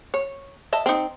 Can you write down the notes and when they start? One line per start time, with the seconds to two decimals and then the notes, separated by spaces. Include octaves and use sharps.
0.14 C#5
0.73 D#5 E5 A5
0.86 C4 D#4